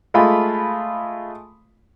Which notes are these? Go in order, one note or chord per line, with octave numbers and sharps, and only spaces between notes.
G#3 A3 F4 B5